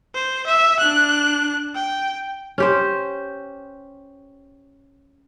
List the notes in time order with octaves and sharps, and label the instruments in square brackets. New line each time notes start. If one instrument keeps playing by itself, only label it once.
[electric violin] C5
E5
D4 F#6
G5
[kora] C#4 G4 C5